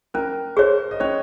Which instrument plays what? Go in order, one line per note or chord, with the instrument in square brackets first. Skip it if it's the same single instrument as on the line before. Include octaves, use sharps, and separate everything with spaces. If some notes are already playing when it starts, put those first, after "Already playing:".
[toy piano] C#4 [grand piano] A#4
[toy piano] G#4 C#5 [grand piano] C5
[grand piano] D#5
[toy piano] C#4 [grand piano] C#5